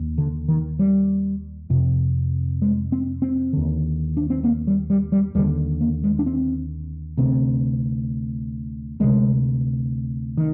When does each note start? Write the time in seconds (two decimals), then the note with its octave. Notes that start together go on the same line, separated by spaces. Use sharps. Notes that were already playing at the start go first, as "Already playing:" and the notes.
Already playing: D#2
0.18 D3
0.48 D#3
0.79 G3
1.70 F2 C3
2.62 G#3
2.92 C4
3.22 C4
3.53 D#2 D3
4.17 D4
4.30 C4
4.44 A#3
4.67 G3
4.90 G3
5.12 G3
5.35 D#2 G3
5.39 D3
5.81 A#3
6.04 G#3
6.19 D4
6.26 C4
7.18 D2 C3 C4
9.00 D2 C3 G#3
10.37 D#3